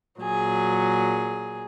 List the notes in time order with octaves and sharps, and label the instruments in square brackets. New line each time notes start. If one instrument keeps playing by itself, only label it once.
[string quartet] A#2 F#3 G#4